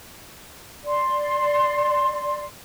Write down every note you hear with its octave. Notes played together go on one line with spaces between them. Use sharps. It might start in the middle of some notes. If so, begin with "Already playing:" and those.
D5 C6